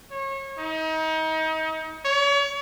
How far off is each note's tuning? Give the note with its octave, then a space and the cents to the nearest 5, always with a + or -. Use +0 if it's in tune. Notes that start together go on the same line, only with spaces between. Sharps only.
C#5 -30
D#4 +30
C#5 +35